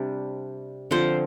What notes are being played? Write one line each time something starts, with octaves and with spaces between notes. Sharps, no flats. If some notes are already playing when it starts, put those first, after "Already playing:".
Already playing: C3 G3 D4
D3 F3 C4 C5